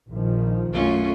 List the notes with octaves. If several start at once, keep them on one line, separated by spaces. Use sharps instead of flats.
A#1 D#3 F3
B1 F#2 A3 C#4 F4